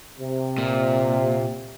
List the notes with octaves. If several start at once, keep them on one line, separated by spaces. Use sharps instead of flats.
C3
A#2